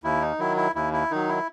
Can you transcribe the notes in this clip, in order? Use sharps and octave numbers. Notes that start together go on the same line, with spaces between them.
D#2 E4
D#4
D#3 F#3 E4
E4
D#2 E4
E4
D#3 F#3 D#4
E4